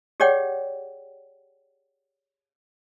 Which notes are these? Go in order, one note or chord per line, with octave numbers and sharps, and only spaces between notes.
G4 G#4 C#5 D5 F#5 G5